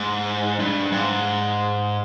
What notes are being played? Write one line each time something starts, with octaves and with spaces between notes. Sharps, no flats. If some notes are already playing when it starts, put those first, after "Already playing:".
Already playing: G#2
G2
G#2